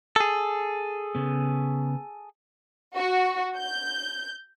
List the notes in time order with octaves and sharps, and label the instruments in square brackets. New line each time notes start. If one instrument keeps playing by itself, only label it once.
[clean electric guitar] G#4 A4
[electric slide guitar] C#3 B3
[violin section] F#4
G6